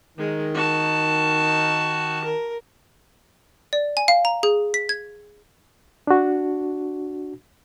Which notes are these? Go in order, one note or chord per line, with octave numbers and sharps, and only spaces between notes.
D#3 G#3
F#4 A5
A#4
D5
G#5
F5
A#5
G#4
B6
G#6
D4 F#4